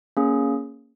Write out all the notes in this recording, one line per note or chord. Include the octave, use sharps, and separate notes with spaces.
A#3 C#4 G#4